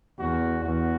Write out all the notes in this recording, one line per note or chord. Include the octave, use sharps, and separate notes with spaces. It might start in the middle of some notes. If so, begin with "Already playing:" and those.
E2 F#4
E2 F#4